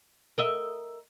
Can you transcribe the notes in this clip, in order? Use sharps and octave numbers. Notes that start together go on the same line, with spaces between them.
A#4 D#5 E5